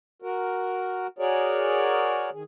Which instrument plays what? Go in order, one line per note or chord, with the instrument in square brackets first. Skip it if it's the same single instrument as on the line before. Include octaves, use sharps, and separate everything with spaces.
[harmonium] F#4 A#4
F#4 G#4 A#4 C#5 D5
D#3 G#4